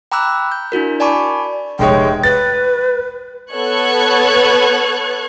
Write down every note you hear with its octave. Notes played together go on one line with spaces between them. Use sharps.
G5 A#5 B5 D6 E6 F#6
G6
D4 E4 F#4 A#4
D5 G#5 A5 B5 C#6 D6
F1 G#3 C#5 G5
B4 A6
B3 A4 C#5 C#6 F#6 G#6